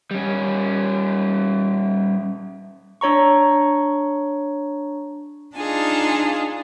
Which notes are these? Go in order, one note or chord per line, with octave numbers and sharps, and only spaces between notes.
G3 C#4
D4 C#5 A#5 C#6
D4 D#4 F4 G#4 A5